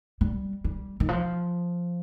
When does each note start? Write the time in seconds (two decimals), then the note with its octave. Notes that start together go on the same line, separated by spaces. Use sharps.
0.21 G3
0.64 G3
1.00 D#3
1.09 F3